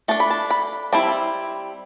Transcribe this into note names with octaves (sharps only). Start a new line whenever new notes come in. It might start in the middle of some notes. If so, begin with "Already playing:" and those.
A3 D4 A5
B5
A5
B5
G3 C4 E4 A5